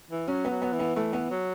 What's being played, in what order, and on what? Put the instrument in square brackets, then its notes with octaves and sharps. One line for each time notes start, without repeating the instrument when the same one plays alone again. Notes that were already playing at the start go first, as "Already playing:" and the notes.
[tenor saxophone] E3
[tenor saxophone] F#3 [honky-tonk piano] C#4
[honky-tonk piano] B3
[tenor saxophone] F#3
[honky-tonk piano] B3
[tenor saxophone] E3
[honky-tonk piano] B3
[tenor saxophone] E3 [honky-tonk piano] A3
[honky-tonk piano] B3
[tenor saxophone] F#3